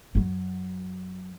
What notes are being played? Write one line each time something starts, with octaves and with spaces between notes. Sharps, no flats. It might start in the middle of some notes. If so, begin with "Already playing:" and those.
F#2 F#3